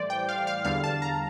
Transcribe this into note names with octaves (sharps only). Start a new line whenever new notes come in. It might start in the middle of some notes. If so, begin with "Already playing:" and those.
Already playing: A2 E3 G3 C5 D5
G5
F5
F5
E2 D3 G3 F5
A5
A#5